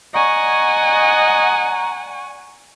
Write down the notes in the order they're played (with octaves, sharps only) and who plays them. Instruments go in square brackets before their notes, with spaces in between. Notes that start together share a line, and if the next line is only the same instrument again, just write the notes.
[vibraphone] D5 C#6 [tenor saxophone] D#5 [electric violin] F#5 G#5 [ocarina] A#5